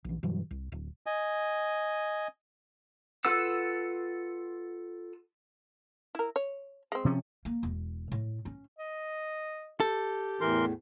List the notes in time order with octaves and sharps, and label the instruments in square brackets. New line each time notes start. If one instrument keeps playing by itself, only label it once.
[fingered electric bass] A#1 E3
G2 B2 E3 F#3
C2
D1
[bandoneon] D#5 G#5
[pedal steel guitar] F4 A4 B4 F#5 E6
[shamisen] E4 A#4
C#5
G#3 C4
[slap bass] C3 F3 C#4
[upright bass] A#3
E1
A2
C#4
[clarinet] D#5
[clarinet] G4 [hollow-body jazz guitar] A4
[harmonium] E2 A2 [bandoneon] E3 A#4 C6